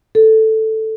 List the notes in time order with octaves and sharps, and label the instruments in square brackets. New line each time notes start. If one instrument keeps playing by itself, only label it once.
[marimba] A4